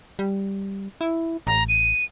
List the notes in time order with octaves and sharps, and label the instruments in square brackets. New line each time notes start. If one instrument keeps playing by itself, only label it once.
[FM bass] G3
E4
[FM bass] A1 [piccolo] A#5
[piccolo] D#7